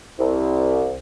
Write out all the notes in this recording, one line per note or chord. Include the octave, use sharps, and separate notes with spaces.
C2